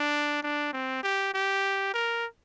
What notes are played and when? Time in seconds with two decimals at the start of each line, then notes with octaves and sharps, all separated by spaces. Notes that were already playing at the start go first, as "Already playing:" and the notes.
Already playing: D4
0.43 D4
0.73 C4
1.03 G4
1.34 G4
1.94 A#4